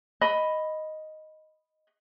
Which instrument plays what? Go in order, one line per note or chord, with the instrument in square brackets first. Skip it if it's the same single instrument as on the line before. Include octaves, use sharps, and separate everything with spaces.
[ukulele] D#5 B5